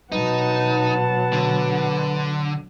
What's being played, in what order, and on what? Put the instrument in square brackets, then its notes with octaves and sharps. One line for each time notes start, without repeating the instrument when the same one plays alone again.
[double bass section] B2 F#3 [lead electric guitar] D#4 [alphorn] B4 [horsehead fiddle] F#5 A5
[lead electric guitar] D3